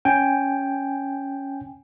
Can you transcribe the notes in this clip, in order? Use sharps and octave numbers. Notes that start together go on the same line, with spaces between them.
C#4 G5 G#5